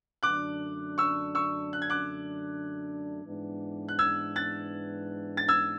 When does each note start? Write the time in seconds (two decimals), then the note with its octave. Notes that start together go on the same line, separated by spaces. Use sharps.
0.23 F#2 D3 A3 D4 D6 F#6
0.98 C#6 E6
1.35 C#6 E6
1.73 F#6
1.82 G#6
1.90 D6 F#6
3.23 G#2 E3 B3 D4
3.88 F#6
3.99 E6 G#6
4.36 F#6 A6
5.37 A6
5.48 E6 G#6